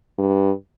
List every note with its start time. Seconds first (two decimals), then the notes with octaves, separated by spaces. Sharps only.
0.18 G2